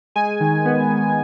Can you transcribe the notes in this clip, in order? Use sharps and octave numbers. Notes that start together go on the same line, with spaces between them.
G#3 G#5
D#3
B3
D#3